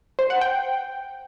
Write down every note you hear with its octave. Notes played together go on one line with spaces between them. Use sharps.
C5
F#5
G5